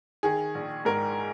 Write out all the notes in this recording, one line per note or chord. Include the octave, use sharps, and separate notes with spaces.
D#3 G#4
A#1
G#2 A#4